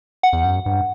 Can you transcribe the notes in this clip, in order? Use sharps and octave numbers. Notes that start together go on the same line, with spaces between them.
F#5
E2
F#2
G2